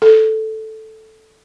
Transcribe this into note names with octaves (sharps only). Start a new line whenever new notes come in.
A4